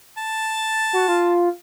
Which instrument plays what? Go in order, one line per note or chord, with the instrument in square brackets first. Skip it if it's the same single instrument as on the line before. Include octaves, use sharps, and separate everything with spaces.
[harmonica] A5
[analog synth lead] A6
F#4
F4